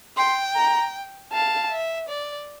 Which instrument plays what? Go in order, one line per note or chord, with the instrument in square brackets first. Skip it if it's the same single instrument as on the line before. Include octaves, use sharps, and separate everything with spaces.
[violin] G5 [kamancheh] C6
[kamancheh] A#5
[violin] F5 [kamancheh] A5
[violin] E5
D5